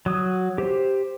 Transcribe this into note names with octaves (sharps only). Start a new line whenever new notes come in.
F#3 D#6
G4 C5